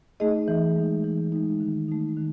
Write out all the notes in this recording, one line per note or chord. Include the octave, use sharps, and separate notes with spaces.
A3 D#4 G#4 D#5
E3
G#3 D#4
E3
G#3 D#4
D#3
A3 D#4
D#3